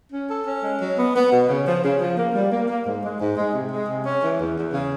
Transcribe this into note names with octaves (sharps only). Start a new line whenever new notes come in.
C#4
A4
C#4
G#3
F#3
B3
B3
B2
C#3
F3
C#3
F3
A#3
G3
A#3
A#3
G#2
G#3
G#2
G#3
C3
G#3
C3
C#4
E3
E2
E2
C#3